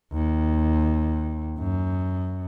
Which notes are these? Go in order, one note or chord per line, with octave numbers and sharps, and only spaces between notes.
D#2
F#2